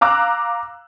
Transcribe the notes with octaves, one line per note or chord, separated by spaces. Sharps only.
F5 A#5 D6 E6 F#6